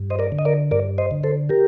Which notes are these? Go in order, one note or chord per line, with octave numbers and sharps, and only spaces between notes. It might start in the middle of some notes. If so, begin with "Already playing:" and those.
Already playing: G2
C5 D#5
A#4 D5
D3
D#5
A#4 D5
G2 A#4 D5
C5 D#5
D3
A4 C5
G4 A#4